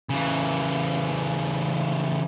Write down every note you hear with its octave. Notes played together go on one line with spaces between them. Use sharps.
C#3 E3